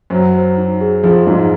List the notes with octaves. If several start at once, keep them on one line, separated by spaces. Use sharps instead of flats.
F#2 F#3 C5
C5
D#4
G#4
F2 F3 G#4
G#2 G#3 D#4